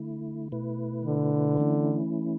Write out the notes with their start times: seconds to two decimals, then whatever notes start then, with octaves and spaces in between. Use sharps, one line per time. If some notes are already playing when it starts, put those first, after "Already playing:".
Already playing: D3 A3 E4
0.52 B2 A3 E4 B4
1.05 D3
1.57 E3 A3 C#4 E4